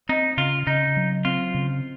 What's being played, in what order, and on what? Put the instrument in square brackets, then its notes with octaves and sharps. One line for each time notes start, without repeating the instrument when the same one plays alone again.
[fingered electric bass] C4 [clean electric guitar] D#4
[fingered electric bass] C#3 [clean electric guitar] F4
[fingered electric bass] C#3 [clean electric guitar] D#4
[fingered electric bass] F#3
[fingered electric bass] C4 [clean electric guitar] F4
[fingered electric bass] C#3